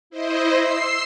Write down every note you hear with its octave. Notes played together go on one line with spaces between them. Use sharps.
E4 C5 D#5
C6 E6 C7